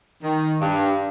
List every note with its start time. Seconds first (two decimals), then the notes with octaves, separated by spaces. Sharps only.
0.23 D#3
0.60 G2